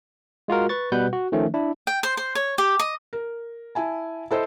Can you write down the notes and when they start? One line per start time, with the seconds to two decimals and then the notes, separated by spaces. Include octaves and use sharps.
0.48 G#3 F4 F#4 A#4
0.69 B4 C#6 A6
0.92 B2 G3 B4 F#5 G6
1.13 F#4
1.32 D#3 F3 A3 C#4
1.54 D4 E4
1.87 G5
2.03 C5
2.17 C5
2.35 C#5
2.58 G4
2.79 D#5
3.13 A#4
3.75 E4 G#5 A5
4.31 E4 A4 C5 D#5